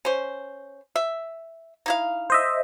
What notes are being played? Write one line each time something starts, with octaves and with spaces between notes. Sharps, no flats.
C#4 C5
E5
D#4 E4 F5
C5 D#5 E5